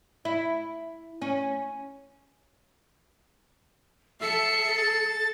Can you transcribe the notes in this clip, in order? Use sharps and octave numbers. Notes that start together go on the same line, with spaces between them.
E4
C#4
A4 E5 C7 C#7
A6